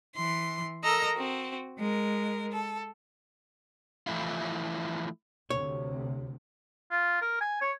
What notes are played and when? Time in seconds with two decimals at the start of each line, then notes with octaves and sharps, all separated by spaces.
0.15 E3 C6
0.83 A4 A#4 D#5 A#5 E6
1.16 C4 F#4
1.77 G#3 A#4
2.52 A4
4.07 E3 F3 A3 E4 F4
5.50 D2 C3 C#5
6.91 F4
7.22 A#4
7.41 G#5
7.61 C#5